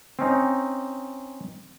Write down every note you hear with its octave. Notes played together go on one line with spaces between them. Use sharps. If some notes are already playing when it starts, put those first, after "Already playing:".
C4 C#4 D#4